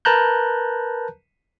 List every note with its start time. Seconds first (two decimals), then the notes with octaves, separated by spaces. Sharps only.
0.05 A#4 B4 A5 A#5 F#6 G6